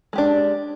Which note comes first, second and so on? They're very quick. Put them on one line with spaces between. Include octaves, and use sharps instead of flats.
G#3 G4 D4